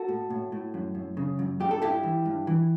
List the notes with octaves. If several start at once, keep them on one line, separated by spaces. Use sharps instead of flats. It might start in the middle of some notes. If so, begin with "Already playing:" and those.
Already playing: F#4 A4
A2
A2
A2
F#2
F#2
C#3
F#2
G2 G4
A4
G2 E4 G4
E3
G2
E3